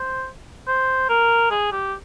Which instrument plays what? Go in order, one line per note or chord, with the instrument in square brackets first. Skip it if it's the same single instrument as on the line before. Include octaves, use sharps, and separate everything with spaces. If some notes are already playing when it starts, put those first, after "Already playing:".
Already playing: [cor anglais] C5
C5
A#4
G#4
G4